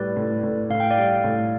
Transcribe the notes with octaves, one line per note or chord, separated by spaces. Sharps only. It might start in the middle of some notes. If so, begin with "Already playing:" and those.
Already playing: A2 G3 B4 D5
A2
A2
A2 F5
G5
D5 F5
G3
A2